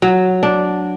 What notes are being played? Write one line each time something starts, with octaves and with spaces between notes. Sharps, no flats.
F#3
D4